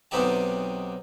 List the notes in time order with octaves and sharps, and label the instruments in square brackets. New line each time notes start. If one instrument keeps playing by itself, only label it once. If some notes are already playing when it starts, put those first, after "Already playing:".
[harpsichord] B1 C3 B3 D#4 G4 A5